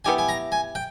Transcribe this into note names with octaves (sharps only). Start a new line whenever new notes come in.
B3 E4 G4 G#5
G#5
A#5
G#5
G5